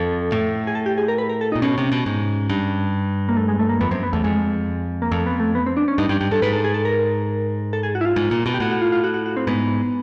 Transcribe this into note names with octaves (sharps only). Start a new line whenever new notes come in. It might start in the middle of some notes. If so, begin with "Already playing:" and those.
Already playing: F2 A4
A2
G#4
A4
G4
G#4
A#4
B4
A#4
A4
D#4
A#2
B2 C#4
C3
B2
G#2
G2
A#3
A3
G#3
A3
A#3
F2 B3
F#2 C4
B3
E2 A3
F2 G#3
A#3
F2 A3
B3
A3
B3
C4
D4
C#4
G2 D#4
G2 G4
G2 G4
G2 A4
G#2 B4
A4
G#4
A4
A#4
A4
G#4
F#4
E4
F4
G#2
A#2
B2
G4
A2 F#4
F#4
F4
F4
F#4
F#4
F#4
C4
G#2 B3